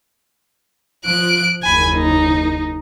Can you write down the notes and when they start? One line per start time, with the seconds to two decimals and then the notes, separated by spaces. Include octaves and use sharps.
1.05 F3 F#6 D7
1.62 F#1 D#2 G#5 B5
1.94 D#4